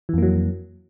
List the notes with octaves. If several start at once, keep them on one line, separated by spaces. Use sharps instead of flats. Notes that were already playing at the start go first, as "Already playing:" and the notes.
F2 E3 F#3 A#3